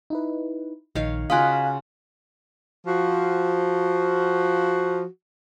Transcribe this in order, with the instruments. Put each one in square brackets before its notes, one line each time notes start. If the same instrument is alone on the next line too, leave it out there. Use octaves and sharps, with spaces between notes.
[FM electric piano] D#4 E4 B4
[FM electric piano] A#1 [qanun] D#3 C#5 F5
[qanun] C#3 F4 F#4 [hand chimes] F5 G#5 [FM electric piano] D#6 F#6
[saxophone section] F3 F#4